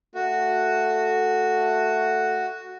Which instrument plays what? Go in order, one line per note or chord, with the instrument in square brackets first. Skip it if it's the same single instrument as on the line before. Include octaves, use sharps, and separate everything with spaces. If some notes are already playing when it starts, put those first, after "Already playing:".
[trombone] A3 [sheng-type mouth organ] F#4